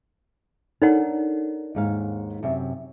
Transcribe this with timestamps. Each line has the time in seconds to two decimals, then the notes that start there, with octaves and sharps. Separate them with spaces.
0.82 D4 D#4 A4 A#4 C#5 F#5
1.75 D#2 G#2 F5
2.43 F#2 C3 E5